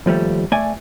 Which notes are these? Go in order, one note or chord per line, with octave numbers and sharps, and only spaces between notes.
D#2 F3 G3 A3
A3 D5 G#5